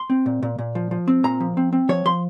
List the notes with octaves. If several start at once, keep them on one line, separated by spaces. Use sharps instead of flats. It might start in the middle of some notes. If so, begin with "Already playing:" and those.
Already playing: C6
C4
A#2
A#2
A#2
F3
F3
C4
A#2 A#5
F3
C4
C4
F3 C#5
F3 C6